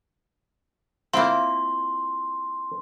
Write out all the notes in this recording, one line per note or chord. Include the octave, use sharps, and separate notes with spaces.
A#3 C4 E4 F4 E5 C6